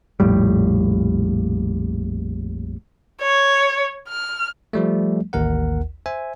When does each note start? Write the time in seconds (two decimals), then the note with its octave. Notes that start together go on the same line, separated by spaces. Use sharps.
0.20 A#1 F2 A2 G3
3.22 C#5
4.09 F6
4.73 F3 G3 A3
5.33 A1 D#2 A#4 F#5
6.06 C5 E5 G#5